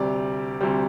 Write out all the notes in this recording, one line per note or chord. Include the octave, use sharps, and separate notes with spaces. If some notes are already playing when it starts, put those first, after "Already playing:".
Already playing: D2 C3 G3 D5
D2 C3 G3